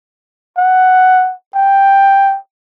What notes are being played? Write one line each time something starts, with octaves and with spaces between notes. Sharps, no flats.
F#5
G5